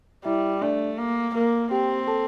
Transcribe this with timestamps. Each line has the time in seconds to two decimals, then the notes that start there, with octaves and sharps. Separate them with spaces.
0.24 G3 E4 E5
0.61 A3 D4 D5
0.98 A#3
1.34 A#3 A#4
1.71 C4 G4 G5
2.07 A4 A5